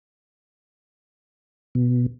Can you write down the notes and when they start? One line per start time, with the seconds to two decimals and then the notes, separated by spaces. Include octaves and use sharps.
1.75 B2